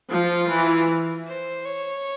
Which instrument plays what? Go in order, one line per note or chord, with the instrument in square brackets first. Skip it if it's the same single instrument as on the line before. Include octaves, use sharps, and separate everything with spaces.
[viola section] F3 [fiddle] F4
[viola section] E3
[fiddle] C5
C#5